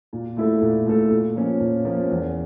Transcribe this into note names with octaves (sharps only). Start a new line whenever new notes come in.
A#2
A3 E4 A4
A#2
A3 E4 A4
A#2
F3 A#3 C#4
A#2
F3 A#3 C#4
E2